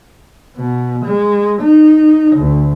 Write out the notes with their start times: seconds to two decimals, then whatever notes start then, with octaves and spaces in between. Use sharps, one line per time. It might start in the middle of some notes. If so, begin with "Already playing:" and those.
0.57 B2
1.05 G#3
1.62 D#4
2.35 D2